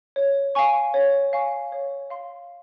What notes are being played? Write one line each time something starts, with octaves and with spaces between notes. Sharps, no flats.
C#5
F5 G#5 C#6
C#5
F5 G#5 C#6
C#5
F5 C6